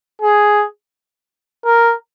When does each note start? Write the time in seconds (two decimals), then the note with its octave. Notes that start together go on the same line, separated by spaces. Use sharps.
0.22 G#4
1.65 A#4